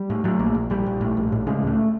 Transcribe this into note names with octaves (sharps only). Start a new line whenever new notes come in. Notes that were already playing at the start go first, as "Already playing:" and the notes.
Already playing: G3
A2
A2 F#3
A#1 A#3
A#1
A#1 G3
A#1
A2
A#1
A2
C#3 G#3
C#2 A3